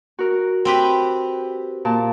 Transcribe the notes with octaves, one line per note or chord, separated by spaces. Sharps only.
F#4 A#4
C4 G4 B4
A#2 A5